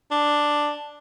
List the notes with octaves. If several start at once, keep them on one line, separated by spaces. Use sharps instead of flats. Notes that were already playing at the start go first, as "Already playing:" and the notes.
D4